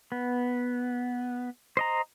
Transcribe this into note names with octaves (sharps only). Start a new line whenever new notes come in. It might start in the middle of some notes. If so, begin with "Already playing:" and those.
B3
C5 D#5 A#5